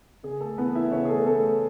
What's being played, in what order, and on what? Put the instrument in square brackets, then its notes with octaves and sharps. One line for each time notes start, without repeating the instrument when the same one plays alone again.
[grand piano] C#3 G#4
A3 A4
E3 B3 B4
E4 E5
C#3 C#4 C#5
G#4
A3 A4
A3 B3 A4